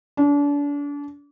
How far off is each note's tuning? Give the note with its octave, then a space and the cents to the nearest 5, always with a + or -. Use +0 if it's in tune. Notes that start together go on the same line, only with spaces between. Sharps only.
D4 -35